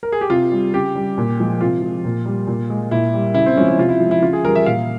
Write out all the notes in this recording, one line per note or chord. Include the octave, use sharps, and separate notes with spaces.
A#4
G#4
G4
C3 F4
G3
C#3 G4
G3
A#2
F3 G#3
C3 F4
F3 G#3
A#2
G3
A#2
G#3
A#2 E4
G3
C#3 E4
C4
F3 G#3 C#4
E4
C3 F4
E4
F3 G#3
E4
C#3 F4
G#4
E3 G3 A#4
E5
A#2 F5